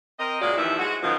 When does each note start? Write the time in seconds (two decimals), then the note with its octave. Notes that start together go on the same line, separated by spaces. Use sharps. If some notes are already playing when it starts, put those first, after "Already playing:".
0.19 C4 A#4 D#5
0.41 A#2 C#3 G#3 F#4 D5
0.57 D#2 E3 F3 E4 E5
0.79 G#3 F#4
1.02 F#2 B2 D#3 F3